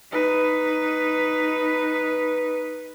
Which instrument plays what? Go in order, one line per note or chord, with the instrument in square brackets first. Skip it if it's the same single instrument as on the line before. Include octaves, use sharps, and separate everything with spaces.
[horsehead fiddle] D#4 B4